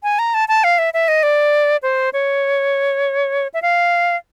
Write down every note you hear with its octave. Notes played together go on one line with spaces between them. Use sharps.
G#5
A#5
A5
A5
F5
E5
E5
D#5
D5
C5
C#5
E5
F5